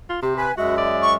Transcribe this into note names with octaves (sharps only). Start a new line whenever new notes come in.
F4
C3 G4
B4 G#5
F#2 G#3 F#4 E5
D5
C#6